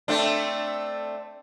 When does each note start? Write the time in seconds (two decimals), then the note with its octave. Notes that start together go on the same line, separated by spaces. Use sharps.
0.08 A3 C4 D4